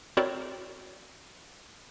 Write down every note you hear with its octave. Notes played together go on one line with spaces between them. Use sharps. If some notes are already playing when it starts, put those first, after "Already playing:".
C4 E4 F#4 A#4 C#5 D5